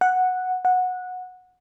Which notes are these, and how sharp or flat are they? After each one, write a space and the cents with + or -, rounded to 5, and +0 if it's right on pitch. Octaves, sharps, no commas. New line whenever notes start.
F#5 -5
F#5 -15